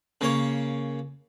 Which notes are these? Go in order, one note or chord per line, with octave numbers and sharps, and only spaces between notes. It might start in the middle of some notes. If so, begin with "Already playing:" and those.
C#3 A#3 C#5